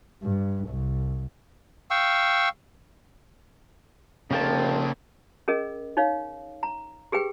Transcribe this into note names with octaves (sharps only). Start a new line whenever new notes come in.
G2
C2
F5 G5 C#6 E6
F1 C#3 F3 A#3 G5 A5
C#4 G#4 A#4 D#5
D#4 C#5 F5
A#5
G4 G#4 B4 G5